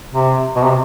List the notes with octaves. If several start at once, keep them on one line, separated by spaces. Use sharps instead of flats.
C3
B2
C3